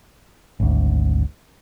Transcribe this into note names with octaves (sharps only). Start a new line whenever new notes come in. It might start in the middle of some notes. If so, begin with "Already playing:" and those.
G#1 D2